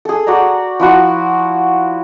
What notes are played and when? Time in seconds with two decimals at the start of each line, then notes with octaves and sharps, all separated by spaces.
0.05 G#4 A4
0.27 F#4 D5 G5 A#5
0.80 F3 E4 F#4